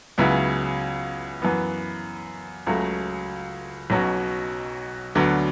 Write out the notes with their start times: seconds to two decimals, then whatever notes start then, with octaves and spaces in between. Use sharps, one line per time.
0.18 C#2 C#3 F#3 B3 E4
1.42 F#2 E3 B3
2.67 C#2 C#3 F#3 A3
3.90 B1 B2 F#3 C#4
5.15 D2 D3 F#3 B3